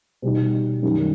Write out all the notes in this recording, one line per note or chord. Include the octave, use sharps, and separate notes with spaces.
B2 G3 D#4
F#2 D#3 G3